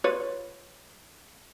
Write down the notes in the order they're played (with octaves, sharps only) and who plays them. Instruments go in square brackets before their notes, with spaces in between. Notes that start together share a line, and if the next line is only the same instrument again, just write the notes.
[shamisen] F4 B4 C#5